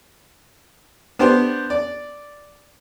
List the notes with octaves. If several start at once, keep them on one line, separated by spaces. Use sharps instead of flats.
B3 D4 G4 C5
D5